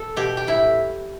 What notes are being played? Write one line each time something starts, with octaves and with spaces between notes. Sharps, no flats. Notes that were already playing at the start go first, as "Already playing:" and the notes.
Already playing: A4
B2 G4
G4
A2 E4